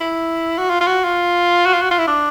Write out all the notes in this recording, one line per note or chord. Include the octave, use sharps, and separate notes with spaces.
E4
F#4
F4
F4
F#4
F4
F#4
F4
F#4
F4
E4
D4